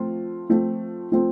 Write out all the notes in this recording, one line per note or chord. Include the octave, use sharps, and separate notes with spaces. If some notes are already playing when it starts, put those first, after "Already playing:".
Already playing: F3 A3 C4 F4
F3 A3 C4 F4
F3 A3 C4 F4